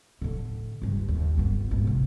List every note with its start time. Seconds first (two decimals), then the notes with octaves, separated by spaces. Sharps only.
0.21 A2 D3
0.82 C#2 G2
1.08 D#2
1.37 G1 B3
1.71 D#1 G#1
1.85 C3 E3